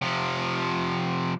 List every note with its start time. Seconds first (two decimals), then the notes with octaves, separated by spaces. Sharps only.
0.01 C3 F3